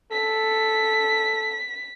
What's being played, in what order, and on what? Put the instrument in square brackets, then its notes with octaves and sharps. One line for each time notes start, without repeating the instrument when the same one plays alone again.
[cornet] A4 [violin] B6